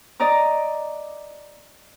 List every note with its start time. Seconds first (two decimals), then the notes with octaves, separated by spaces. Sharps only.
0.20 D5 D#5 A#5 D6